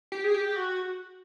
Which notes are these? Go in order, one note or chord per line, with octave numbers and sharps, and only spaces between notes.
G4
G#4
G4
F#4